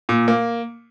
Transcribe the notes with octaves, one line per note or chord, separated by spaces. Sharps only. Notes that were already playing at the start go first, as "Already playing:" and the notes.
A#2
A#3